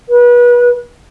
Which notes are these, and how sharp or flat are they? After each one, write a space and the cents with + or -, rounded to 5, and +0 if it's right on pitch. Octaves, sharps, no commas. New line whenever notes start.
B4 -30